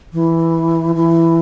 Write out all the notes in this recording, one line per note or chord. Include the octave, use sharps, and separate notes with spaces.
E3
E3